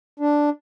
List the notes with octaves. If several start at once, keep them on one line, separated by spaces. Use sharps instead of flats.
D4